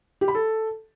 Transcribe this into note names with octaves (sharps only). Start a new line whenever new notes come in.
G4
B5
A4